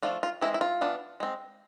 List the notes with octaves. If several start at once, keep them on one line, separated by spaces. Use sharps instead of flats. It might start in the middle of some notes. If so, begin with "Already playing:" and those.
F3 A3 D4 F4
F4
E3 G#3 C4 E4
E4
F4
E3 B3 D4
G#3 C4